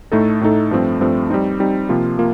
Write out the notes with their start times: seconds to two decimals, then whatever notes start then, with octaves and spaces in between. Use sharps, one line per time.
0.12 A2 A3 D#4 A4
0.41 A2 A3 D#4 A4
0.71 G2 F3 A3 C4
1.01 G2 F3 A3 C4
1.30 G3 C4 D#4
1.60 G3 C4 D#4
1.89 C3 F3 A#3 F4
2.19 A#3 F4